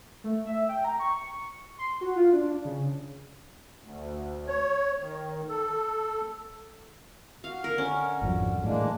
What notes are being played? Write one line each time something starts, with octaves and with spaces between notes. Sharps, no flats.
A3
E5
G5
A#5
C#6
C6
F#4
F4
D4
C#3
D2
C#5
D#3
A4
F#4 F5
D3 A#4
C#4
G#1 F2 F#3
A2 E3 G#3 A#3 D4